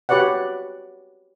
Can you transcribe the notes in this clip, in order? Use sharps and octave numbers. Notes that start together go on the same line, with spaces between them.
F#4 G4 B4 C#5 D5 F#5